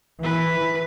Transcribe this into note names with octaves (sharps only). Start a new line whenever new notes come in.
E3 B4